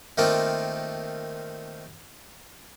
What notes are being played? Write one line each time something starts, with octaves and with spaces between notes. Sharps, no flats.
D#3 A3 A#3 C4 F4